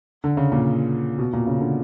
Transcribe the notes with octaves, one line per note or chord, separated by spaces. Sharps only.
D3
C#3
A#2
B2
A#2
C#3
D3